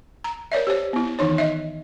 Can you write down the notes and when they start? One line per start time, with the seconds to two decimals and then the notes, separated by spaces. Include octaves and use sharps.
0.24 A#5
0.52 A#4 C#5 D5 E5
0.67 G4 C5 C#5
0.93 B3 E4
1.19 D#3 E3 D#4 C#5
1.38 D#5 E5